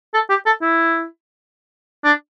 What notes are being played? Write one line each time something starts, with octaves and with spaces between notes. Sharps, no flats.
A4
G4
A4
E4
D4